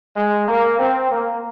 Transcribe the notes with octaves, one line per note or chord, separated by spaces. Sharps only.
G#3
A#3
C4
A#3